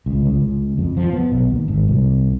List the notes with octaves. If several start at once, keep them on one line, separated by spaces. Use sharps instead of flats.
C#2
C#2
C#2
F2
F3
B3
B1
D#2
G#1
C2